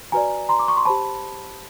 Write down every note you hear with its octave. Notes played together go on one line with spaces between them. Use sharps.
F#4 B4 D5 G#5 A#5
A#5 C6
D6
C#6
C6
G4 C5 A5 B5